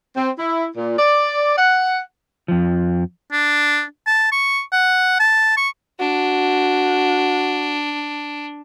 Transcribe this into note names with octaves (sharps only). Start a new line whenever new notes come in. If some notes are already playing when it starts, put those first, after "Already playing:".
C4
E4
A#2
D5
F#5
F2 F3
D4
A5
C#6
F#5
A5
C#6
D4 F#4